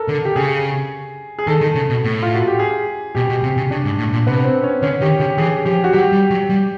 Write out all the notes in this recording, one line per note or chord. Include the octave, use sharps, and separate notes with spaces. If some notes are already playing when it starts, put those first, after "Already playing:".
Already playing: A4 A#4
D3
G4
C#3 G#4
G#4
D#3 A4
D#3
C#3
B2
A2
F4
F#4
G4
G#4
B2 G4
B2
C3
C#3
C#3 D4
G#2
A2
A#2
C3 B3
C4
C#4
D3 C#4
D#3 G4
D3 G4
E3 G#4
F3 G4
F#4
F#3 G4
G3
F#3
G3